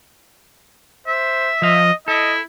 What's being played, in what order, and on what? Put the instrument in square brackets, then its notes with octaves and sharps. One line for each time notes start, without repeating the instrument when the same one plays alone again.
[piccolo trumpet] C5 [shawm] E5
[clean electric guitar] F3 F5 [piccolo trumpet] D#5
[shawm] E4 [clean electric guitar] A4 [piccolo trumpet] D#5